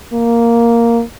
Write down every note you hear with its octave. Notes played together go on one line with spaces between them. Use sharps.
A#3